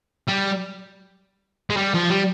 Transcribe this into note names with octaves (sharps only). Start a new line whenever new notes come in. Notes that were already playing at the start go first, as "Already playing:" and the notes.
G3
G#3
G3
F3
G3